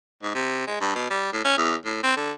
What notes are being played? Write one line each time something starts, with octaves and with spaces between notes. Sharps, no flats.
G#2
C3
G#3
G2
B2
G3
A2
C#4
E2
A2
C4
D3